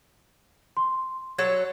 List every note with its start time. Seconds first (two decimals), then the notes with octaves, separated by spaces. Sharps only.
0.77 C6
1.38 F#3 A4 C#5 G#6